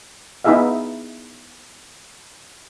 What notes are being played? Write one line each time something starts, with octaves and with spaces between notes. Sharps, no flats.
B3 D#4 E4 G#4 E5 F5